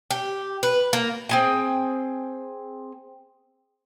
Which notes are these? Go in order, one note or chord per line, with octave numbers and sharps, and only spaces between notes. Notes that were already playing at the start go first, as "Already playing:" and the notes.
G4
B4
A#3
C4 G#4 G5